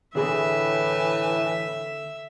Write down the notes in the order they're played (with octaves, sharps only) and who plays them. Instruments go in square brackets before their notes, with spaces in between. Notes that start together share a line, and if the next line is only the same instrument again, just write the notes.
[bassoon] A2 [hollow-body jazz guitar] D3 G#4 B5 [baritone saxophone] E3 [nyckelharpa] E5